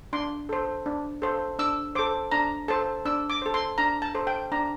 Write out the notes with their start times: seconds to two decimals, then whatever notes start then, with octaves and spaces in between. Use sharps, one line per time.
0.13 D4 C6
0.49 A4 C5
0.86 D4
1.22 A4 C5
1.59 D4 E6
1.95 A4 C5 D6
2.31 D4 A#5
2.68 A4 C5 A5
3.05 D4 E6
3.30 D6
3.42 A4 C5
3.54 C6
3.78 D4 A#5
4.02 A5
4.15 A4 C5
4.27 G5
4.52 D4 A#5